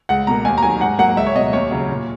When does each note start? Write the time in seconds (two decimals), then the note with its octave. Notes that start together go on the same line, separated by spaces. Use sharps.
0.09 C#2 F#5
0.27 B2 A#3 A#5
0.45 D#2 G#5
0.58 A#5
0.63 D#3 F#3 G#5
0.81 G#2 F#5
0.99 F#3 A#3 F#5
1.17 C#2 E5
1.26 C#5
1.36 B2 F#3 D#5
1.53 D#2 C#5
1.71 C#3 F#3
1.88 A#2